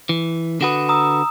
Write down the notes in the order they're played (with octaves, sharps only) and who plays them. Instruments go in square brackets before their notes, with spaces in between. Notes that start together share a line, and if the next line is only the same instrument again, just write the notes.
[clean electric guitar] E3
[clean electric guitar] D3 F#4 B4 [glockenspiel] D#6 E7
[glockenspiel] A#5 D#6 E6